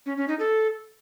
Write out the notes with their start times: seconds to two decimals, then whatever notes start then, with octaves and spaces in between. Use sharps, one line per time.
0.06 C#4
0.17 C#4
0.28 D#4
0.39 A4